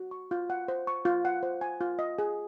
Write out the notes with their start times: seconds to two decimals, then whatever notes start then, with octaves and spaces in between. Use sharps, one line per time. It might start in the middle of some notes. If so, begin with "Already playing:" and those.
Already playing: F#4
0.11 C#6
0.31 F4
0.50 F#5
0.68 C5
0.87 C#6
1.05 F4
1.25 F#5
1.43 C5
1.61 G#5
1.81 F4
1.99 D#5
2.19 G#4